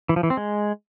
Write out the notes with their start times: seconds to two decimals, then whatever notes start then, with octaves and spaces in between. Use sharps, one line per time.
0.09 E3
0.16 F3
0.23 E3
0.30 C4
0.37 G#3